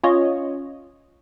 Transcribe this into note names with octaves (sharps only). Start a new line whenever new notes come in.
C#4 F4 C#5 D#5